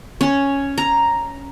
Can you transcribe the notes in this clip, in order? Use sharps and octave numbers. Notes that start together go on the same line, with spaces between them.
C#4
A#5